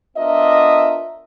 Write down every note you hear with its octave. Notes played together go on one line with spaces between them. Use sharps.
B3 D4 F4 A#4 D#5 E5